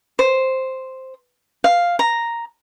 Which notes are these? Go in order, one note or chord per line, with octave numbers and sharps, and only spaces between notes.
C5
F5
A#5